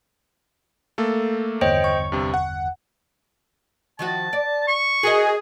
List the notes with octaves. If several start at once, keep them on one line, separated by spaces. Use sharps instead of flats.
A3 A#3 A4
G1 E2 C5 C#5 D#5 G5
C#6
G2 C3
F#5
D#3 F3 F#4 A5
D5
C#6
F#4 G#4 A#4 D#5